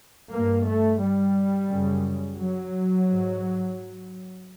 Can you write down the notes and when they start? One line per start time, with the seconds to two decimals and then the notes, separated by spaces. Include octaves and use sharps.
0.32 G2 A#3
0.66 A3
1.01 G3
1.69 F#2 C#3
2.37 F#3
3.06 G#2